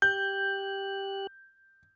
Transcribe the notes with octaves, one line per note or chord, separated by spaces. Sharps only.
G4 F#6 G6